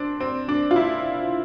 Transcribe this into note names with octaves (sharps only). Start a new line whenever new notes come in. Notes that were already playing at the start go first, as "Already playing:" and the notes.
Already playing: C4 D4
C4
D4
F4
E4